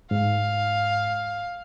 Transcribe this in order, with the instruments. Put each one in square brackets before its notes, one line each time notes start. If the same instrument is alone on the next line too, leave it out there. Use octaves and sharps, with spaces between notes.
[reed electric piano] G#2 [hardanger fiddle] F5